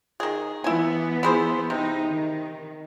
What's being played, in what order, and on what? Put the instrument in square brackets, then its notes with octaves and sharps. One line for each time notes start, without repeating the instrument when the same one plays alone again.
[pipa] D#3 G#4
[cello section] E3 B3 [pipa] E4 G#5
[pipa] E4 G#4 C5
[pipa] C3 [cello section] D#4
[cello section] D#3